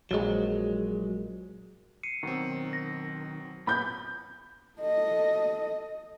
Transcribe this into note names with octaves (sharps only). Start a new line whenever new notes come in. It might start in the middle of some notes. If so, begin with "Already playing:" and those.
A#1 F#3 G#3
C7 C#7 D#7
B2 D#3 F#3 C4
A#6
A#2 B3 C#4 B5 G6
A4 D#5